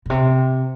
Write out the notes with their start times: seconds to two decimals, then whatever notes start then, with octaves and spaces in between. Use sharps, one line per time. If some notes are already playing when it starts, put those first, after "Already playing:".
0.06 A#2
0.10 C3